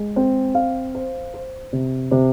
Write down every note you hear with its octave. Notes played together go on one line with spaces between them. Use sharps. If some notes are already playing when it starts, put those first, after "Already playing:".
Already playing: G#3
C4
F5
C5
C5
C3
C3